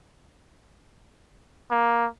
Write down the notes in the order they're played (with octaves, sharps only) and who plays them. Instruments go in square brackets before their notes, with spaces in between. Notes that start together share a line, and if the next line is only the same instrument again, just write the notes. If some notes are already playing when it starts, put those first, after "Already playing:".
[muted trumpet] A#3